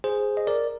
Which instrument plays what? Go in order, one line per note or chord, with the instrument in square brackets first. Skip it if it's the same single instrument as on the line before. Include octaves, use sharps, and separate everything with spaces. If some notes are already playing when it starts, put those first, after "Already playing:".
[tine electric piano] G#4 C5
D#5
A#4 D5